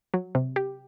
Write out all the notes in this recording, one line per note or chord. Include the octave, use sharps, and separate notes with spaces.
F#3
C3
G4